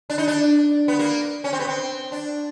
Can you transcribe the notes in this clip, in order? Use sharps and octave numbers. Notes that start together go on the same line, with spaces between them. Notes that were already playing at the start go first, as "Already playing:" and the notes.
D4
D#4
D4
B3
A#3
C#4
C4
B3
C4
D4